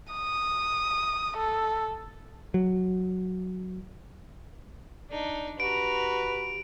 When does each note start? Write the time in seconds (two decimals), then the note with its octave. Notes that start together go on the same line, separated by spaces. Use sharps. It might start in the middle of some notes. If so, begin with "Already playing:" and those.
0.12 D#6
1.37 A4
2.54 F#3
5.10 D4 D#4 D5
5.60 F#4 G4 B4 A#5 D7